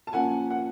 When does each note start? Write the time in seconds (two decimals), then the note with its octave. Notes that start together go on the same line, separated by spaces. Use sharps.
0.07 A5
0.13 A#2 F3 A#3 C#4 F#5 G#5
0.50 F#5